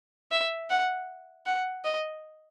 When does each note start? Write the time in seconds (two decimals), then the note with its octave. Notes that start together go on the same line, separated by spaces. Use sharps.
0.31 E5
0.70 F#5
1.46 F#5
1.85 D#5